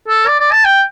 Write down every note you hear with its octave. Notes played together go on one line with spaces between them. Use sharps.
A4
D5
D5
A5
G5